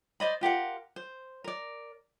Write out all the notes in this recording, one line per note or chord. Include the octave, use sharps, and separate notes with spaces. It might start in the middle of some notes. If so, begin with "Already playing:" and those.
C5 D5 D#5 B5
F4 G4 A#4 F#5
C5
A#4 D5